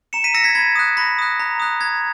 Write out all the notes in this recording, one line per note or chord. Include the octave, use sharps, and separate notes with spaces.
A#5 C#7 E7
B6 D#7
E6 A#6 C#7
G#6 B6
B5 G#6
D#6 F#6
B5 A#6
D#6 F#6
A#5
D#6 F#6
A#5 G#6